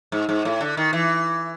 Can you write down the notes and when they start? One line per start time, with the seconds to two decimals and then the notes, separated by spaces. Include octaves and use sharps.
0.12 G#2
0.29 G#2
0.45 A2
0.61 D3
0.77 D#3
0.93 E3